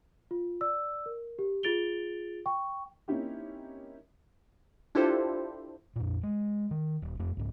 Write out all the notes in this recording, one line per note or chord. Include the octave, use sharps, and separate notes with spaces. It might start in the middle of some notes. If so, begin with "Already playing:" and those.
F4
D5 E6
A#4
G4
F4 G#4 A6 D7 F7 G7
G5 C#6
A#3 C4 C#4 D#4 E4 G4
D4 E4 F4 G4 A4 C5
F2 A#2
G#3
D#3
D#1
F2 A3
C2 G#2